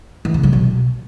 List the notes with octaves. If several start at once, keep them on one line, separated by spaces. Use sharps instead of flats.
E3
C#3
F#3
B2